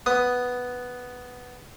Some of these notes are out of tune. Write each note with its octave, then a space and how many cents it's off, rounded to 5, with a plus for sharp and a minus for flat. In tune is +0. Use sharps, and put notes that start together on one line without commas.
B3 +0 D#6 +0